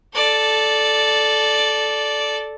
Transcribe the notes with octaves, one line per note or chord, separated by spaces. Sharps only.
A4 D5